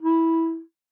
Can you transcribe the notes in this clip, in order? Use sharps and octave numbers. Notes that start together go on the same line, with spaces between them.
E4